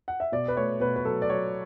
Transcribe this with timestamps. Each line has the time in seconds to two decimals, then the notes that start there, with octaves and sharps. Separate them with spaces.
0.08 F#5
0.20 E5
0.32 B2 D5
0.48 B4
0.56 A3 C#5
0.80 B2 B4
0.96 B4
1.05 F#3 A4
1.22 D5
1.30 F#3 C#5